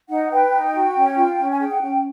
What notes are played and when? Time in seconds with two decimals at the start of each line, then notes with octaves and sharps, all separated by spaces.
0.09 D#4 F#5
0.31 B4 G5
0.52 D#4
0.73 F#4
0.96 C#4
1.16 F4
1.39 C#4
1.52 G#5
1.59 G#4 G5
1.71 F#5
1.81 C#4 G5